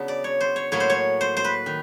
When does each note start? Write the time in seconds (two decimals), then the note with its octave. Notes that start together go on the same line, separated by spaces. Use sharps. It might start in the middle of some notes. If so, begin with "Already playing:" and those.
Already playing: C#3 F#3 B3 D4
0.08 D5
0.24 C#5
0.41 C5
0.56 C#5
0.72 A2 F#3 A#3 C#5
0.80 C5
0.90 C#5
1.21 C5
1.37 C5
1.44 B4
1.66 D#3